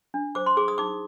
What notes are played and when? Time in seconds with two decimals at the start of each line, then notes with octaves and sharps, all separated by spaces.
0.14 D4
0.35 C5 D6
0.46 C6
0.57 G#4 D6
0.68 D#6
0.78 D#4 D6